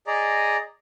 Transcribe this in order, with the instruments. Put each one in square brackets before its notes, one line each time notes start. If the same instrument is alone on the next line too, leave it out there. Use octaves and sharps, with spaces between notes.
[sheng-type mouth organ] G#4 D5 D#5 A#5